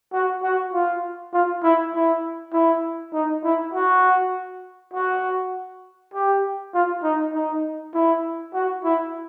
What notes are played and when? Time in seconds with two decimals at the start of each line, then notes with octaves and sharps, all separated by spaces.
0.13 F#4
0.43 F#4
0.73 F4
1.33 F4
1.63 E4
1.94 E4
2.53 E4
3.13 D#4
3.43 E4
3.74 F#4
4.94 F#4
6.14 G4
6.74 F4
7.03 D#4
7.34 D#4
7.94 E4
8.54 F#4
8.84 E4